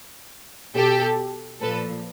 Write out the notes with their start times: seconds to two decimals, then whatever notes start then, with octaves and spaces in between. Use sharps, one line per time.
0.76 B2 G4 A4
1.61 A#2 F3 A4 B4